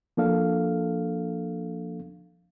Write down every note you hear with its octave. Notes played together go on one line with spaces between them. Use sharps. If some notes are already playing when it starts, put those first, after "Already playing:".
F3 A#3 D4 A4 F5